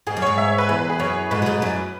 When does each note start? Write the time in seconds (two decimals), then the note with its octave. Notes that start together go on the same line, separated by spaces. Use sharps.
0.07 G#2 G#4
0.17 F#2
0.22 G#2 C#5
0.38 E5
0.48 C#5
0.58 B4
0.69 E2 G#4
0.79 B4
0.90 G#4
1.00 F#2 C#5
1.31 G#2 G#3 B4
1.42 F#3
1.46 G#2 G#3
1.62 F#2 F#3